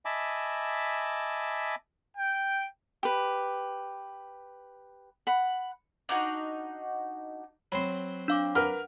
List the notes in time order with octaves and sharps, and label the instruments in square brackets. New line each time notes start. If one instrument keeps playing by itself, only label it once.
[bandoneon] D#5 E5 G#5 A5 B5 D6
[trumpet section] G5
[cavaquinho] G4 B4
F#5 B5
[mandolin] D4 D#4 F#4
[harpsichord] F#3 C4 C5 [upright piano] B5
[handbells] D4 F5 D6
[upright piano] A#4 B4 F6 [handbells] F#5